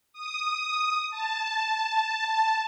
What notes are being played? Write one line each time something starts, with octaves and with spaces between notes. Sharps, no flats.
D#6
A5